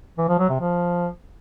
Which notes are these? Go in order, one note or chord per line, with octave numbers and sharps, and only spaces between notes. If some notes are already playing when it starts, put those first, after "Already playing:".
E3
F3
F#3
C3
F3